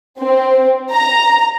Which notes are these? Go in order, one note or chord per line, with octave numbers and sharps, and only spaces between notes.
C4
A#5